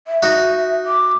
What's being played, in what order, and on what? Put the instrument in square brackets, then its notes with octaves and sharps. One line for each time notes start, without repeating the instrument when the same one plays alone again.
[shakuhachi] E5
[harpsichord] D#4 F#4
[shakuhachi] D6